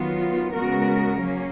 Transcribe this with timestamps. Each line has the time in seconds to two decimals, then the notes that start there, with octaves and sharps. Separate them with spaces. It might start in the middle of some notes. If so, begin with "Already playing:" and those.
Already playing: D#3 F#3 B3 F4
0.54 C#3 G#3 B3 F#4 A#4
1.21 F#3 A#3 C#4